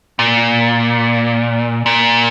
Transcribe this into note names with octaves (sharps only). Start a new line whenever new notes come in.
A#2
A#2